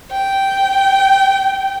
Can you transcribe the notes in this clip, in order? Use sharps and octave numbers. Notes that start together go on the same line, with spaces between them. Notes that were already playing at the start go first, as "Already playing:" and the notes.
G5